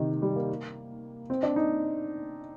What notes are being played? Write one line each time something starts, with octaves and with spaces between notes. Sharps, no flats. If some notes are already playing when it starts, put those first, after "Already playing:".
Already playing: C3 D#3
G3
A#3
C4
D4
D#4